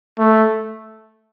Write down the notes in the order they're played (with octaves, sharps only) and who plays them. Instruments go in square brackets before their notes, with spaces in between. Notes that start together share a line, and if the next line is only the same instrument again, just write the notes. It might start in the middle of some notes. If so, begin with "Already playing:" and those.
[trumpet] A3